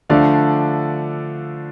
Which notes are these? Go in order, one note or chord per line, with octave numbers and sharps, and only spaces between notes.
D3 F3 A3 D4 D5 F5